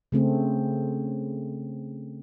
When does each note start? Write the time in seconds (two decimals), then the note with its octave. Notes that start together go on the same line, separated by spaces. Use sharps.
0.12 C#3 A3 C4 G#4